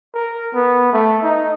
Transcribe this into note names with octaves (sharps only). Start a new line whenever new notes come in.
A#4
B3
A3
D#4